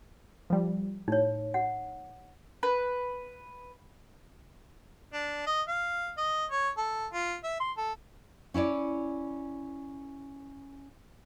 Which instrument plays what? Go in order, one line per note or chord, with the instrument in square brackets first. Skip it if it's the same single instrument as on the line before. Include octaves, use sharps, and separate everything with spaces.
[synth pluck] F3 G3
[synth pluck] A2 [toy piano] D#4 C#5
[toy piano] F#5
[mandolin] B4
[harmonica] D4
D#5
F5
D#5
C#5
A4
F4
E5
C6
A4
[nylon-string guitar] C#4 E4 C#5 D5